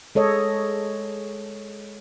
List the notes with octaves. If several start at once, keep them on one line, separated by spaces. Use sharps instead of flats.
G#3 A4 C#5 D#5